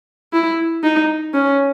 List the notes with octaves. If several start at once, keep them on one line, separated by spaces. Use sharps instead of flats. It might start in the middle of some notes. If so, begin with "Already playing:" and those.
E4
D#4
C#4